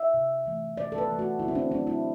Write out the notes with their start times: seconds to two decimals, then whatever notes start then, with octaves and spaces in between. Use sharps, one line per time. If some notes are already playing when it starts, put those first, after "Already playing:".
Already playing: E5
0.14 C3
0.46 E3 A3
0.77 C3 D5
0.92 A4
0.98 B4
1.08 E3 A3
1.19 F#4
1.39 D3 E4
1.48 C4
1.55 D4
1.71 F#3 A3 D4
1.87 E4